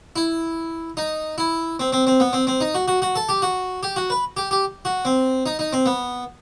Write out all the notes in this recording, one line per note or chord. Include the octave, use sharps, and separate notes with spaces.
E4
D#4
E4
C4
C4
C4
B3
C4
C4
D#4
F#4
F#4
F#4
A4
G4
F#4
G4
F#4
B4
G4
G4
F#4
C4
D#4
D#4
C4
B3